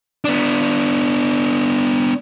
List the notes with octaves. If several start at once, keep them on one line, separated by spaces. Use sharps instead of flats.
B3 D4